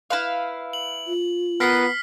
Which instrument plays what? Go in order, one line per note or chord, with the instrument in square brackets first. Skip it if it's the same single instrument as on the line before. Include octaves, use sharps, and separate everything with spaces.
[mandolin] E4 B4 F5
[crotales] F#7
[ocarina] F4
[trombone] B3 [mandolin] A#4 B4 F#5 [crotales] F6 B6 C7